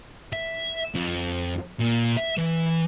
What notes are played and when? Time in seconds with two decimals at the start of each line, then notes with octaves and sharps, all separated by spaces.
0.33 E5
0.95 F2
1.79 A#2
2.17 E5
2.38 E3